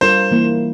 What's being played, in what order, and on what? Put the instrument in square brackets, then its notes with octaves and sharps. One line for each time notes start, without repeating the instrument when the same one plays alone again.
[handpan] G3 D4 F4 A#4 [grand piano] C5
[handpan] E3 A#3 E4